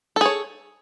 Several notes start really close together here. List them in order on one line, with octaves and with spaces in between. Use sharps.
A4 G#4 C#5